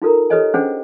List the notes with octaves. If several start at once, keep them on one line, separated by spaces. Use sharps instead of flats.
D#4 F4 A4 A#4 A#5
G4 A4 B4 C#5 D#5 G#5
C#4 D4 G#4 C5 F#5 G#5